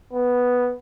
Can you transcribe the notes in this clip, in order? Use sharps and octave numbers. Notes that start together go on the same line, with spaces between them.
B3